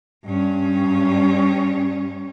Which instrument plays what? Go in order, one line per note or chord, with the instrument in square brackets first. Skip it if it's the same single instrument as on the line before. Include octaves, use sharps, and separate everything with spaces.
[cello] G2 C#4